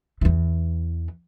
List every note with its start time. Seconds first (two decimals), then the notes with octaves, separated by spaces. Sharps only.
0.21 E2 E3